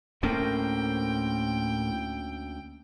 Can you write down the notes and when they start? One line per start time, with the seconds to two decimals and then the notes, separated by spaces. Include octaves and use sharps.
0.23 D2 A2 A#3 C#4 A#4 C5 G5